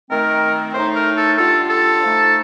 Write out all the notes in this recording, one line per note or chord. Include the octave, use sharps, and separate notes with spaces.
D#3 A3 C4 A#4
A2 A3 D#4 C5
A#4
A4
D3 G3 D4 F4 A4
A4
F3 A3 D#4